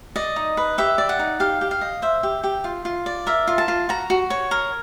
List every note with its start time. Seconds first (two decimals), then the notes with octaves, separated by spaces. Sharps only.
0.16 D5 D#5
0.36 D#4
0.57 B4
0.78 G4 E5
0.98 D5
1.09 F#5
1.19 D#4
1.40 G4 F5
1.61 G4
1.71 F5
1.81 D#5
2.02 C5 E5
2.23 G4
2.44 G4
2.64 F4
2.85 F4
3.06 D5
3.27 A#4 E5
3.48 F4
3.58 A5
3.68 F4
3.89 F#4 A#5
4.10 F#4
4.30 C#5
4.51 A#4